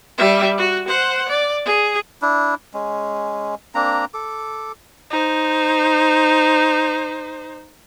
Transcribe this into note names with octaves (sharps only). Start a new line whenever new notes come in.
G3 E5
F#4
C5 F#5
D5
G#4
D4 E4
G#3 C#4
A#3 C4 D4 A#5
A4 D6
D#4 C5